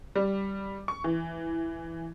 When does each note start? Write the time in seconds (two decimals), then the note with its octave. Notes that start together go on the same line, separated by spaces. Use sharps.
0.15 G3
0.88 C#6
1.04 E3